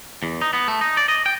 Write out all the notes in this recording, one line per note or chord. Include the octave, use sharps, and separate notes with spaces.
E2
D#4
B3
A3
D#4
D5
D#5
G5